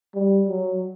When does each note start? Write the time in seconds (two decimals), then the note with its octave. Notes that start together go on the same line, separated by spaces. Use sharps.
0.15 G3
0.49 F#3